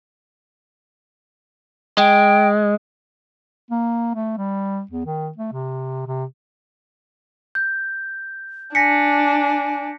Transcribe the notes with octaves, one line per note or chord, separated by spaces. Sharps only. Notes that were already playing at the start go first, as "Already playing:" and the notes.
G#3 G5
A#3
A3
G3
E2
D#3
A3
C3
C3
G6
D4 G#5 A#6 B6 C#7